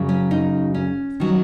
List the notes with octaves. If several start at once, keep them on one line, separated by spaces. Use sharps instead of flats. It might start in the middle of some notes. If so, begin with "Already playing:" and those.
Already playing: F#2 C#3 F#3
C#4
D#4
C#4
D#3 F#3